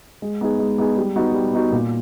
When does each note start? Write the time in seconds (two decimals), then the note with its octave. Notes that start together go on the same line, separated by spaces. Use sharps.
0.22 G#3
0.41 B3 D#4 G#4
0.59 G#3
0.78 B3 D#4 G#4
0.97 G3
1.16 B3 D#4 F#4
1.34 G3
1.53 B3 D#4 F#4
1.72 A#2